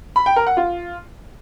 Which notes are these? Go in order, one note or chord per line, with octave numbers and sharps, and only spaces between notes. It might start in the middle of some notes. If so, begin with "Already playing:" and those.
B5
G5
A#4
F#5
F4